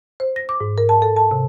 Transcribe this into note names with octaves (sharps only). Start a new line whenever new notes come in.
C5
A#6
D6
G#2
A#4
A5
A4
A5
C3